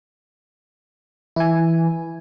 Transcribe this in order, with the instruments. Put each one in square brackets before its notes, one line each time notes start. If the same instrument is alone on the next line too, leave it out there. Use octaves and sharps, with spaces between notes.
[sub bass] E3 [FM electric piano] E4 G#5